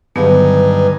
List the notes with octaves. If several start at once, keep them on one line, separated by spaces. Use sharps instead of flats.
G2 D3 D#3 F#3 B3 D#4 B4 G#5